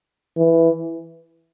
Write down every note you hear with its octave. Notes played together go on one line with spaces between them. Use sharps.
E3